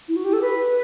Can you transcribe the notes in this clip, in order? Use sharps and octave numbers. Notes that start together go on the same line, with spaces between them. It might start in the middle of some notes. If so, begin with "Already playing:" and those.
E4
F#4
G4
A4
B4